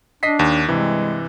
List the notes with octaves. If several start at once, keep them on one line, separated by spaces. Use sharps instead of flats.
D4 D#5 B6 C7
D#2
G2 C3 E3 G#3